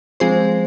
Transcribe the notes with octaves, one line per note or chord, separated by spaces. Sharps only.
F3 G#3 C4 G#4 C5